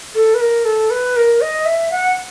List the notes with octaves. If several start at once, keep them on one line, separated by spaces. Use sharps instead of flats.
A4
B4
A#4
A4
B4
A#4
D#5
E5
F#5